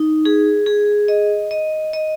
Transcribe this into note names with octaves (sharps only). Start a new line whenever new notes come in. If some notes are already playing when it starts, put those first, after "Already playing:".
Already playing: D#4
G#4
G#4
D#5
D#5
D#5